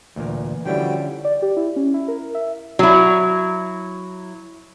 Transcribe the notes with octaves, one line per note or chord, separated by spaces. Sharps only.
D2 A#2 E3 A#4
D3 F3 G3 C#4 E4 F#4 G5
D5
G4
E4
C#4
E4
A#4
E5
F#3 E4